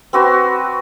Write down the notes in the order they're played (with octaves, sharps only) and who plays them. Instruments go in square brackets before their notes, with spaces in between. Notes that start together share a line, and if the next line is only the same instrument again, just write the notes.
[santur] C4 F#4 B4